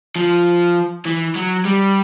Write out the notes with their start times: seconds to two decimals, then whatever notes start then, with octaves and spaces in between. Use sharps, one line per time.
0.16 F3
1.05 E3
1.35 F#3
1.65 G3